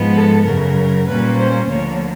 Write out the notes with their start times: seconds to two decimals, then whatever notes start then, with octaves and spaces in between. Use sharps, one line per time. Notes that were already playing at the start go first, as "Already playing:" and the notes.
Already playing: G#2 F3 G#3 B3
0.15 A4
0.45 F#2 C#3 F#3 A#4
1.07 A#2 G3 A#3 C#4 B4
1.37 C5
1.68 D2 D3 F3 A#3 C#5